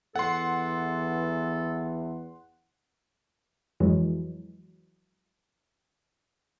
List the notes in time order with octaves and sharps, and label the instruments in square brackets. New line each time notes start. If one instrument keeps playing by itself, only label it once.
[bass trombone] E2 [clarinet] A4 [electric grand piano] F#5 C6
[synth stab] F2 E3 F#3 G#3